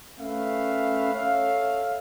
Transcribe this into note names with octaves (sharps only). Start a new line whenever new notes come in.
A3 C#4 B4 E5 F5
A4 C#5 E5 F5